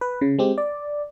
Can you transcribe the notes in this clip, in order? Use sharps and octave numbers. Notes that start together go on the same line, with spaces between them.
B4
C#3
G#3 C4 G4
D5